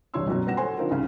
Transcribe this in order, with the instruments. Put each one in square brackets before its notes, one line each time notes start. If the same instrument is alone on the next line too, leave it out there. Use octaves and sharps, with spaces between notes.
[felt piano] E1 C2 G2 C#5 C6 E6
F#2 B2 F#3
G3 B3 F#5 A#6 E7
A4 C5 C#5 F#5 G#5 C6
D3 F3 C4 D#4 F4 A#4
C2 G#2 C#3